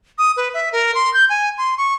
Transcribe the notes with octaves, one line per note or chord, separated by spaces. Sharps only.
D#6
B4
E5
A#4
C6
G6
G#5
C6
C#6